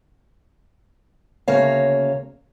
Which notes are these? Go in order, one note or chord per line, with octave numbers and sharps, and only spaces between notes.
D2 C#3 A#3 C#5 F5